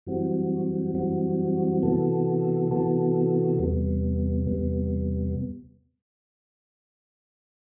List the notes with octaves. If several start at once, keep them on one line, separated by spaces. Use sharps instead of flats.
F#2 E3 G3 C4 F#4
F#2 E3 G3 C4 F#4
C3 E3 B3 F#4 A4
C3 E3 B3 F#4 A4
E2 C3 G3 B3
E2 C3 G3 B3